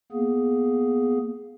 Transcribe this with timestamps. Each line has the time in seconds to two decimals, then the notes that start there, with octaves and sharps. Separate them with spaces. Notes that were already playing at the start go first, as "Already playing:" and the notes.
0.12 A#3 B3 G#4